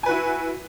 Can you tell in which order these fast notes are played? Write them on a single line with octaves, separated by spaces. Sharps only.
G#5 B4 F#4 E4